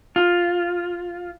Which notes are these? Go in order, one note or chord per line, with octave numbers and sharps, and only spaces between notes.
F4